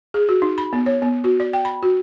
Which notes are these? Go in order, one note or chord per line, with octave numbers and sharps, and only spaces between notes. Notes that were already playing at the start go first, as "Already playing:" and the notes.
G#4
F#4
D#4
B5
B3
C#5
B3
F#4
D5
G5
B5
F#4